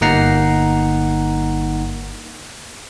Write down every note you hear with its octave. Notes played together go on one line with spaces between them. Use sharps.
G1 A#3 D#4 F#5 A#5 C7